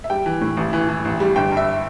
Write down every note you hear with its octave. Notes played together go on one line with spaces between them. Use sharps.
E5
G3 G5
E3
A2
A1
E3
E3
A1
G3
G1 G5
G2 E5